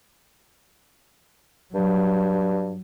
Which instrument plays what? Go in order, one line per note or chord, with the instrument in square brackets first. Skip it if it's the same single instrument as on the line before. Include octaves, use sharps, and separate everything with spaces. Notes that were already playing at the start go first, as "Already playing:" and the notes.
[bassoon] G2 [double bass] F#3